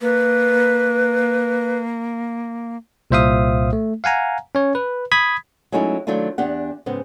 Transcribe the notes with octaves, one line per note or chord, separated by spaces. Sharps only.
A#3 B4
C2 A#2 C5 E5 F5 D#6
A3
F5 F#5 G#5 A#5
C#4 C#5
B4
B5 D#6 G#6 B6
F#3 G#3 A3 C#4 D#4 E4
D#3 F#3 A3 D4 E4 F4
E2 D4 G4 F#5
G#2 C#3 B3 C4